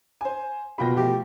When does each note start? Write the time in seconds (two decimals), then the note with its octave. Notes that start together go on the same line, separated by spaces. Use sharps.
0.21 C5 G#5
0.78 B2 A#3 F4 G5 B5 A#6
0.97 F3 A3 G4